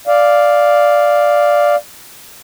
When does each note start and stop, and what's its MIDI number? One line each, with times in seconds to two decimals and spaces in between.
0.07 1.76 74
0.07 1.76 77